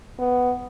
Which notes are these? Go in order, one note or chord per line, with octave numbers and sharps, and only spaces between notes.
B3